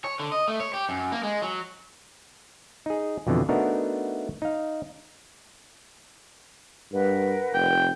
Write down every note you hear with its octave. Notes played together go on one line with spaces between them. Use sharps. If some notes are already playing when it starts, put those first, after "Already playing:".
C#5
D3
D#5
A3
C#5
G4
F#2
A#3
G#3
F#3
D#4 G#4
F2 B2 D3 E3
A3 B3 D4 D#4 F#4 A#4
D#4 F5
G2 A#4 B4 F#5
F1 G5